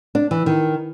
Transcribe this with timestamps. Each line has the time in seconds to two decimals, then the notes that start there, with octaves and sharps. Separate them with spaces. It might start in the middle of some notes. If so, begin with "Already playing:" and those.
0.15 D4
0.31 E3
0.46 D#3